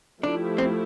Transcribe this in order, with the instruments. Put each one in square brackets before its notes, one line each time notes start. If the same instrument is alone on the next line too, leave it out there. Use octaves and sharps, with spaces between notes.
[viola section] F3 A3 E4 G4 [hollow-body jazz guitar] D4
[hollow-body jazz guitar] C4